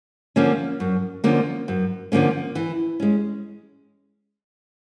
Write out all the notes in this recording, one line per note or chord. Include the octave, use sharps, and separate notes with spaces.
D3 F3 A#3 C#4
F#2
D3 F3 A#3 C#4
F#2
D3 F3 A#3 C#4
E3
G#3 C#4